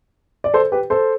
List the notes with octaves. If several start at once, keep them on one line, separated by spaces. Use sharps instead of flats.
D5
A4 C5
G4 B4
A4 C5